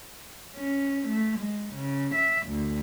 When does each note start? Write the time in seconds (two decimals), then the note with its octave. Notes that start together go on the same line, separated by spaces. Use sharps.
0.55 C#4
1.08 A3
1.38 G#3
1.74 C#3
2.14 E5
2.46 D2